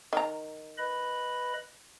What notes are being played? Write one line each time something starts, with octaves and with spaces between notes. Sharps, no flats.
D#3 A#5
B4 D#5 B5